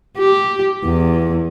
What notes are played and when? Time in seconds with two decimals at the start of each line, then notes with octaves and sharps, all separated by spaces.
0.18 G4
0.84 E2